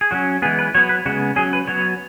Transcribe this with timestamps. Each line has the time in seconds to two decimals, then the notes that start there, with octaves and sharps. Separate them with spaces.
0.01 G#4
0.11 F#3 C#4 F#4
0.42 E3 G#3 B3 G#4
0.59 B4
0.75 F#3 B3 C#5
0.89 B4
1.06 C#3 G#3 B3 F#4
1.36 F#3 C#4 G#4
1.53 B4
1.68 F#3 B3 C#5